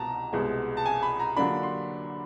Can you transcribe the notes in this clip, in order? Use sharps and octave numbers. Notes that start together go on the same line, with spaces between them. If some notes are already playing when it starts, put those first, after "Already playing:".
Already playing: C2 B2 A5 A#5
C2 B2 G#3
A5
G#5
B5
A#5
D3 F#3 A#3 D4 F4 B5
C6